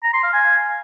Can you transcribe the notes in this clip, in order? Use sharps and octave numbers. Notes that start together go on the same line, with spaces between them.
A#5
C6
F5
G#5